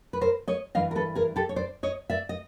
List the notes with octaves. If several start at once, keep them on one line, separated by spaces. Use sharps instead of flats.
B4
A#4 C5
C#5 D#5
G2 E3 D#5 F5
A#4
A4 B4
G#4 A#4
G4 A4
C#5
C5 D5
C#5 D#5
D5 E5
D#5